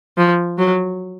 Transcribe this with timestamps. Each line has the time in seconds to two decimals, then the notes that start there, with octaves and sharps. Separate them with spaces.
0.17 F3
0.58 F#3